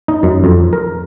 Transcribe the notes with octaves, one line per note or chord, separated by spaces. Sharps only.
D#4
F#2
F2
A#4